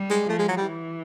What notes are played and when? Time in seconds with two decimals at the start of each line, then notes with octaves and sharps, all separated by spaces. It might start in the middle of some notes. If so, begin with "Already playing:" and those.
Already playing: G3
0.10 G#3
0.29 F3 A3
0.39 G#3
0.48 F#3
0.57 G3
0.67 E3